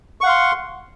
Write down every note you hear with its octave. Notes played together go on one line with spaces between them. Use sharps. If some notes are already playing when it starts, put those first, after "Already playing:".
F5 F#5 C6 C#6